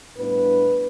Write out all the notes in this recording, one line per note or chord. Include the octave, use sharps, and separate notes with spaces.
A2 G3 B3 D4 B4